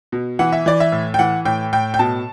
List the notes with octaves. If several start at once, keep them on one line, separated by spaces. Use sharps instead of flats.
B2
E3 F#5
E5
E3 D5
E5
A2
G5
E3 F#5
A2 G5
A2 G5
G5
B2 A5